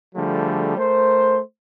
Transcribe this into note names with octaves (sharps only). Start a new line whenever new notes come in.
D3 F3 G3 A3 G#4
A3 A#4 C5